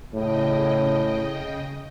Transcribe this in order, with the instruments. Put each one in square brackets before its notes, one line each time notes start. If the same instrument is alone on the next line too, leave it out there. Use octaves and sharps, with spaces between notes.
[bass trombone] A2 [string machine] C#3 D#5 G5